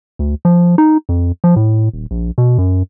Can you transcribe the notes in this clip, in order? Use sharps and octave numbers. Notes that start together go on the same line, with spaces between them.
D2
F3
D#4
F2
F3
A2
D#1
A#1
B2
F#2